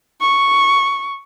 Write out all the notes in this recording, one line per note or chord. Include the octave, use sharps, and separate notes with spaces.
C#6